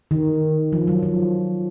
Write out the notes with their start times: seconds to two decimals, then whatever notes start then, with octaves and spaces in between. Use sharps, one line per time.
0.11 D#3
0.72 F3
0.87 F#3
1.03 F3